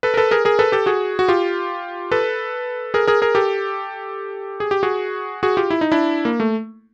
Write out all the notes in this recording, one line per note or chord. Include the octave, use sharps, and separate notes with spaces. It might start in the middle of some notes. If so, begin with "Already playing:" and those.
A4 B4
A#4
A4 B4
G#4 A#4
G#4 A#4
A4 B4
G4 A4
F#4 G#4
F#4
F4 G4
A4 B4
G#4 A#4
G#4 A#4
G#4 A#4
G4 A4
G#4
G4
F#4 G#4
F#4 G#4
F4 G4
E4
D#4
D4 E4
A#3
A3